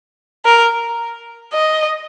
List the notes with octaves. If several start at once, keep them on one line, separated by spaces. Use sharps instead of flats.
A#4
D#5